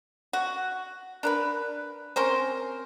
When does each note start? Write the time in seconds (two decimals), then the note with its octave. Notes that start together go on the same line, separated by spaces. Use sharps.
0.33 F#4
1.23 D4 A#4 B4
2.16 C4 C#4 A#4 C5